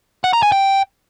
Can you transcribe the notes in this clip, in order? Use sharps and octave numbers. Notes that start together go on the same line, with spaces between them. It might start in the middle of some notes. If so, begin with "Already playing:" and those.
F#5
A#5
G#5
G5